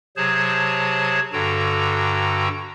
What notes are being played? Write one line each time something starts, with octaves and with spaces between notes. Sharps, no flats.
C3 F#3 G#4 C5 C#5 A5
G2 D3 F#4 A4 G5 A#5